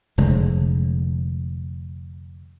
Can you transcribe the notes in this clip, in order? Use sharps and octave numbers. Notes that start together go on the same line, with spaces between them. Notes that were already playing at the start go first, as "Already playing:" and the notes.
F1 D3 G#3